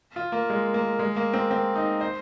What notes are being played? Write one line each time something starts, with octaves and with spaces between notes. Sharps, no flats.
F4
A#3
G#3
A#3
G#3
A#3
C4
C4
D#4
C5